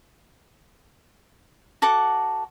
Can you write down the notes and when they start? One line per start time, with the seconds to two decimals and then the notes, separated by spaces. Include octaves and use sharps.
1.82 F#4 A4 F#5 D6